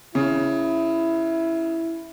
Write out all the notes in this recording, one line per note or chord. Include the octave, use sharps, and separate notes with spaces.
C#3 E4